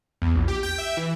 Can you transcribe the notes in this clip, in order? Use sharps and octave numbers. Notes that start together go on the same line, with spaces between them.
E2
A#1
G4
G5
E5
E3